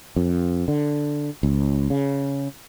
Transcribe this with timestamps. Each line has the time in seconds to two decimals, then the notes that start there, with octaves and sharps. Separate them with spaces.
0.16 F2
0.68 D3
1.43 C#2
1.90 C#3